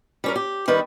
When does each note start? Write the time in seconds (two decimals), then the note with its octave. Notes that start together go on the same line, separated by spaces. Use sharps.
0.24 G3 C#4 A#4
0.36 G4
0.68 D#3 G3 B4